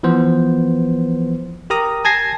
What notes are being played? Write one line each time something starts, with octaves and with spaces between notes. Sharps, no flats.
E3 F3 B3 C5
G4 A#4 A#5 D#6
G#5 A5 G#6 A#6 C7